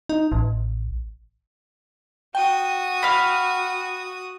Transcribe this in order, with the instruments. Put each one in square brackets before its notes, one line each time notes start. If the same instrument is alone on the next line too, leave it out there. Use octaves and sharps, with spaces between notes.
[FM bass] D#4
A1
[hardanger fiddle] F#4 D#6 [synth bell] G5
[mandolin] F5 B5